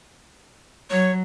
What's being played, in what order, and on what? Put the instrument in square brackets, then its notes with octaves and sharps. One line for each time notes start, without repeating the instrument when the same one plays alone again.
[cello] F#3 [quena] C#5